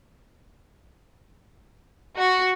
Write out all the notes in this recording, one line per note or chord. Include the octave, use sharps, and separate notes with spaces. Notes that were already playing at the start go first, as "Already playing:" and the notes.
F#4